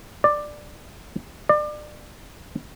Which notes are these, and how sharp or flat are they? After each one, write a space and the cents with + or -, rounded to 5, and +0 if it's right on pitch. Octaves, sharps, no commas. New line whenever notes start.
D5 +10
D5 +30